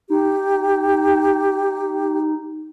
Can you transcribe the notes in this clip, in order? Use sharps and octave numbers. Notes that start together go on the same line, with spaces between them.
D#4 G4